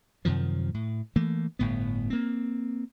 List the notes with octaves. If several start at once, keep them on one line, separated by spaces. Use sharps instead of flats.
F#2 C3 D#3 F3
A2
E3 A3 A#3
G1 A2 B3
A#3 C4